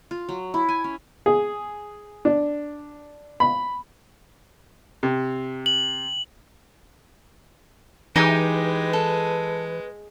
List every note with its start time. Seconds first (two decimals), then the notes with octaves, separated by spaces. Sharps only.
0.11 F4
0.29 F#3
0.54 E4
0.69 G#5
0.84 C#4
1.26 G#4
2.25 D4
3.40 B5
5.03 C3
5.66 F#7
8.16 E3 G#3 D#4 G4 B4 G#5
8.93 A4